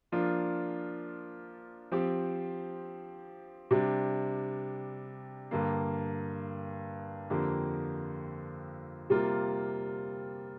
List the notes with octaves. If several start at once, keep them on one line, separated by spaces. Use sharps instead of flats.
F3 A#3 D4 F4
F3 C4 G4
C3 G3 D4
G2 D3 A#3
F2 D3 A#3 G4
C3 G3 A#3 F4